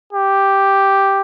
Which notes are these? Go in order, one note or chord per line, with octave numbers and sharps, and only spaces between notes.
G4